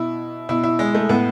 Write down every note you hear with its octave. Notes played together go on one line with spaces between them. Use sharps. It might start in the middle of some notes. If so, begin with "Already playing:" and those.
Already playing: B2 E4
B2 E4
E4
G#3
A3
A2 B3